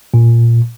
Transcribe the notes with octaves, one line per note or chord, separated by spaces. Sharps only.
A#2